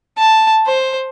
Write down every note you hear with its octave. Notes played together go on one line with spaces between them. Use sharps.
A5
C5